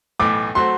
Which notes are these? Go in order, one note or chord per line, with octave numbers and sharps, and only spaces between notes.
B1 A2 E3 A3 D6
F#3 A3 C4 F#4 C6